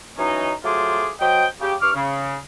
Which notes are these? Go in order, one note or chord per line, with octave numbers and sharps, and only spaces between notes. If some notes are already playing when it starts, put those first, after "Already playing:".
E3 F#3 C#4 D#4
F#3 A3 F4 G#4 C5 D6
F#3 C5 D#5 G5
C#3 G4
G2 C#6 D6 F6
C#3